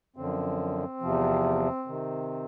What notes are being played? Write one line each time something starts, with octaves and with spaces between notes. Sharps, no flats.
F#2 D3 F3 C4
E2 C3 F3
C3 D#3